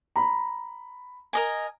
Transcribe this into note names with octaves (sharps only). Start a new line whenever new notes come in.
A#5 B5
A#4 D#5 G#5